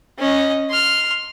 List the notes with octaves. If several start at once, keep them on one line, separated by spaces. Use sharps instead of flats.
C#4 D#5
C6 F6